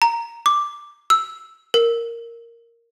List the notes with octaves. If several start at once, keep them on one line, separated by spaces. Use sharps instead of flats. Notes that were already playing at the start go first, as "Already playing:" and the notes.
A#5
D6
E6
A#4